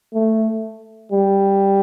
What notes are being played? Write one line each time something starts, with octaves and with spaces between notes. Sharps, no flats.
A3
G3